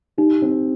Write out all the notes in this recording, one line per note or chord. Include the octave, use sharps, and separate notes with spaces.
D#4 G4
C4